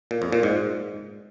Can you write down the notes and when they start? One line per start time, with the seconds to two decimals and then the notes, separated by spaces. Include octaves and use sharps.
0.11 A#2
0.22 F2
0.32 A#2
0.43 G#2